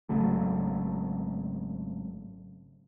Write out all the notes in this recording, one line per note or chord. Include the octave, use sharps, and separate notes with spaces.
G#1 C#3 F#3 A3